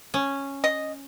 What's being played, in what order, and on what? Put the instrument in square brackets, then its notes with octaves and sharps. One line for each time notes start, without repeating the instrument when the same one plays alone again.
[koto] C#4
[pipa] D#5